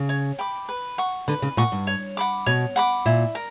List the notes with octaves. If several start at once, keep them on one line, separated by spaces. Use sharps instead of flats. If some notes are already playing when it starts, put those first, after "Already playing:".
Already playing: C#3
C#5
G5 B5 D6
B4
F#5 C#6
D3 B4
C#3
A#2 F#5 C#6
G2
C#5
F#5 B5 D6
B2 C#5
F#5 B5 D6
A#2 E4
A#4